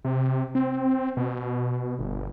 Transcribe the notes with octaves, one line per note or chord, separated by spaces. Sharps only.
C3
C4
B2
G1